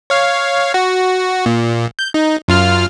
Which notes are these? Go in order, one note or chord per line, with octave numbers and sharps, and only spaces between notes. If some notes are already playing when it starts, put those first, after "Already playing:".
C#5 F5
F#4
A#2
G6
D#4
F#2 F4 F6